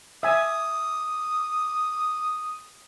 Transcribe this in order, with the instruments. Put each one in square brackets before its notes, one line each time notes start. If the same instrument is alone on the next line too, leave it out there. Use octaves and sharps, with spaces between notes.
[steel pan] E5 G#5 [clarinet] D#6